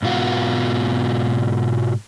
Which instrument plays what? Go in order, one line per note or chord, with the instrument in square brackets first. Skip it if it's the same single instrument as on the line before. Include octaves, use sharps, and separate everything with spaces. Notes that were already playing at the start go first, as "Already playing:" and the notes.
[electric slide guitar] G#2 B2 F4 F#4